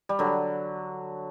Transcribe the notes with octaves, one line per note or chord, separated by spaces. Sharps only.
G3
D3 F#3